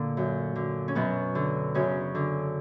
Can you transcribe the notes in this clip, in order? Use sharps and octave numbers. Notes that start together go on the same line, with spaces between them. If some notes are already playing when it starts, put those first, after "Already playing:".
Already playing: A#2 D3 A#3
F#2
D3
C#4
F#2 B2 B3
D3
F#2 C#3 C#4
D3